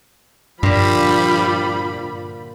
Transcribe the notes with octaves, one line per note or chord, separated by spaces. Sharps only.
G2 A#2 D3 F3 G3 B5